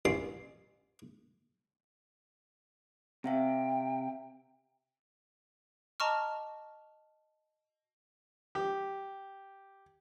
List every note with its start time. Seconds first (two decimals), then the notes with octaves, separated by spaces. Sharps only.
0.05 A1 C6
3.24 C3 C4 E5 F5 G5
6.00 D#5 A5 A#5 C#6 D6 F6
8.55 G4